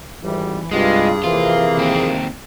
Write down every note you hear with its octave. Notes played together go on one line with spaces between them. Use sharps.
G#1 E3 G3
C2 G2 G#3 F4 G#4
F2 C3 E3 A#3 F4
D#2 C4